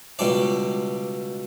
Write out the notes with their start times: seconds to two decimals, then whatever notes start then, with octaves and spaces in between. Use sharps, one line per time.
0.19 C#2 B2 G3 D4 D5